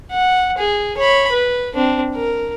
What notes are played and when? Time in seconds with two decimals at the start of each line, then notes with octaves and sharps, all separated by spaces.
0.11 F#5
0.58 G#4
0.97 C#5 B5
1.32 B4
1.75 C4 D4
2.16 A#4